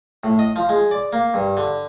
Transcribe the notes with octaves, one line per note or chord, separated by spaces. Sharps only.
A2
D#5
F3
G#3
D5
A#3
G2
D3